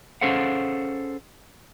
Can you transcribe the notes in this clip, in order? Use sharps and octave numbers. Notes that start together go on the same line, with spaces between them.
C#4 G#4 A4 C5 F5 F#5